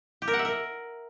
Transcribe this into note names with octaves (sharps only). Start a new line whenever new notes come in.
G4
A#4
F#5
E5
A#4